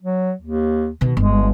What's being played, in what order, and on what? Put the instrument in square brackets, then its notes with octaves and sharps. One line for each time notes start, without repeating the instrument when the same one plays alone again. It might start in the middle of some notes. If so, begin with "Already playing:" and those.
[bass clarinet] F#3
D#2
[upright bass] B2 D#3
[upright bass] G1 [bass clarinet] G#3